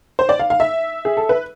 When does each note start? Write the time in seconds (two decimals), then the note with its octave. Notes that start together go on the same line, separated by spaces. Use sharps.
0.19 C5
0.29 D5
0.39 F5
0.50 F5
0.60 E5
1.05 G#4
1.17 A4
1.29 B4